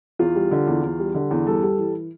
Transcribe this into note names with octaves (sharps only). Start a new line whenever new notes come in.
E2 F4
G3
D3
E2
E2
G3
D3
E2
G2 A4
G3
E3